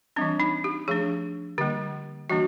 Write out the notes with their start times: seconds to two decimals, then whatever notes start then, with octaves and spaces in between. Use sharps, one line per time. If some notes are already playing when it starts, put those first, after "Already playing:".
0.16 E3 G3 C4 D4
0.40 D#4
0.64 G4
0.88 F3 A3 D4 G#4
1.58 D3 G3 A#3 G4
2.30 E3 G3 A#3 D4 F#4